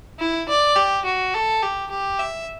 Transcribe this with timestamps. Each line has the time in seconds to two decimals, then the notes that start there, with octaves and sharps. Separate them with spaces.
0.19 E4
0.49 D5
0.76 G4
1.05 F#4
1.34 A4
1.63 G4
1.91 G4
2.19 E5